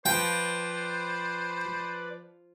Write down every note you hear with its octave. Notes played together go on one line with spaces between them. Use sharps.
F3 B4 C5 D5 G5